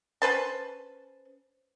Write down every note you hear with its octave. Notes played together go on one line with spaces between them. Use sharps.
C#4 B4 C5 A5